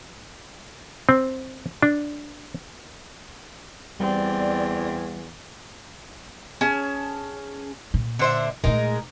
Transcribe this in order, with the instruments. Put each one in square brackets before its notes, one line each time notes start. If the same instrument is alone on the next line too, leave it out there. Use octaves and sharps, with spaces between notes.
[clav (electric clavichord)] C4
D4
[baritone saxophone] E2 [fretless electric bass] G3 [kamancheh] C4 [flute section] D5
[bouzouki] C#4 G#4 A5
[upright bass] A#2
[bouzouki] D3 C5 E5
[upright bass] A#2 A3 [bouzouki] G#3 D#4 A#4